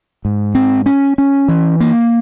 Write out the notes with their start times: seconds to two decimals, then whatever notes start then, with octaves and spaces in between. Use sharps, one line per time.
0.25 G#2
0.55 C4
0.86 C#4
1.18 C#4
1.48 E3
1.81 A#3